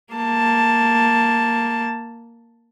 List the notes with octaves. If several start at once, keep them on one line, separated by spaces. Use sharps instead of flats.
A#3 A5